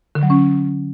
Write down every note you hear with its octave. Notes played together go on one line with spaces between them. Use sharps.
D3
F#3
C#4